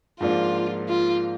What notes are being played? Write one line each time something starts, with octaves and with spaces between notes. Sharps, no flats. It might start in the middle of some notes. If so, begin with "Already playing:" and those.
G#2 F3 A#3 D4 F4
F4